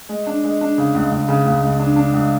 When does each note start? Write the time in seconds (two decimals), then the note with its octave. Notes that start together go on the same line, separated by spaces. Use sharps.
0.09 G#3
0.27 D4
0.44 G#3
0.61 D4
0.78 C#3
0.95 C#2
1.11 C#2
1.28 C#3
1.46 C#2
1.63 C#2
1.79 D4
1.96 D4
2.14 C#2